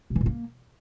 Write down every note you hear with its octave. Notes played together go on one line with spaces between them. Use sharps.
B2
E3
A#2
A#3